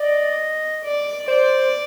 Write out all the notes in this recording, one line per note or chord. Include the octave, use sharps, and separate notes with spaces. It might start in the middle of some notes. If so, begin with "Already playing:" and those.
Already playing: D5 D#5
D5
C5 D5